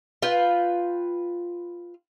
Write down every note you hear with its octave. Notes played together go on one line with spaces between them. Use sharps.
F4 B4 G5